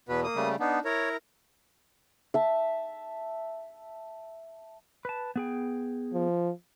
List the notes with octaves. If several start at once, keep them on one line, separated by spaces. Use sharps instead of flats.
E2 B2 B3 B4
A#3 D#6
C#3 G3 A3
B3 D4 D#4
E4 A#4 C#5 A#5
E5 A5
B4 A5
B3 G#4 G5
F3